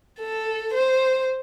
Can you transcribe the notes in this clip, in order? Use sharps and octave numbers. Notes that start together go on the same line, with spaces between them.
A4
C5